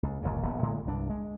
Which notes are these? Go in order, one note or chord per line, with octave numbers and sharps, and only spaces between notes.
C#2
G1 D#2 A#2 C#3
D#1 A#1 D#2 B3
A2 D3 G#3
C2 G2 D4
G#3